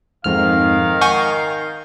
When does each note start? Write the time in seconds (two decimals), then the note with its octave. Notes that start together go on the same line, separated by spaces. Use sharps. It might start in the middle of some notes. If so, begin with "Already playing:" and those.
0.24 F2 G#2 D#3 F5 F6
1.01 F#5 G#5 C#6 G6